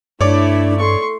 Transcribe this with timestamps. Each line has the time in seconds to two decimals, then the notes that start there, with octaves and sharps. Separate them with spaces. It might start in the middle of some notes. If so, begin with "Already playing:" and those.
0.21 G2 A3 D4 E4 C#5 D5 D6
0.79 A4 C6 C#6